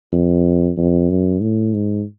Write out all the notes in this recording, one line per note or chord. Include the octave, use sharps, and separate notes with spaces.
F2
F2
F#2
A2
G#2